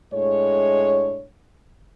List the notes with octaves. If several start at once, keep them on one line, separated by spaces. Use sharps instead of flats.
A2 G#3 D4 C#5